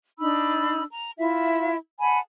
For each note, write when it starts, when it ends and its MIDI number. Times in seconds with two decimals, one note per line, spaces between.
0.19 0.82 62
0.19 0.82 63
0.19 0.82 83
0.19 0.82 88
0.90 1.10 82
1.18 1.76 64
1.18 1.76 65
1.18 1.76 76
1.99 2.19 78
1.99 2.19 80
1.99 2.19 81
1.99 2.19 83